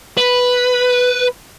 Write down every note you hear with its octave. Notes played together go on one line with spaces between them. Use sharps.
B4